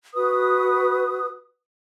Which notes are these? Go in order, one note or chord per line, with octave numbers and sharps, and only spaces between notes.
F#4 B4 D#6